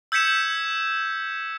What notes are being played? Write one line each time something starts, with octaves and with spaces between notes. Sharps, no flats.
E6 G6 G#6 B6 C#7 E7